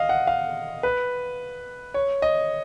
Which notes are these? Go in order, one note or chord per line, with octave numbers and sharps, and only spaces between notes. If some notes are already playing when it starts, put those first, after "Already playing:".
Already playing: D#5 F5
F#5
F5
B4
C#5
D#5